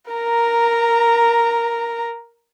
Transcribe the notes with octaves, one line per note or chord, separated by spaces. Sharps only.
A#4 A#5